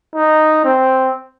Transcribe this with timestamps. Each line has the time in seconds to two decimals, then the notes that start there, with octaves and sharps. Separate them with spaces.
0.15 D#4
0.65 C4